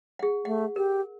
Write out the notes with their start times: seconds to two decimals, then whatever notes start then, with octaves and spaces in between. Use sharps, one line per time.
0.19 G#4 F#5
0.45 A3 F#5
0.76 G4 A#4